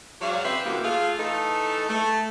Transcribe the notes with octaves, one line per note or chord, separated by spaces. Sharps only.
G#2 F#3 D5 F5
C#3 C4 B4 E5
A#2 C#3 E3 A#3 F#4 G4
A3 F4 G#4 A4 F5
E3 A3 D#4 A4
A3